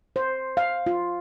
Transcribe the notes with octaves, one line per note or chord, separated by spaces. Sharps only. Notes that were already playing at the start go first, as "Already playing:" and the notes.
C5
F5
F4